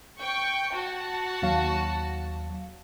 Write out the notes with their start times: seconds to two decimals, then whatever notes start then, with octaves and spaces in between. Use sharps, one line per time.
0.19 G5 C#6
0.74 F#4 A5
1.42 D#2 F#3 F5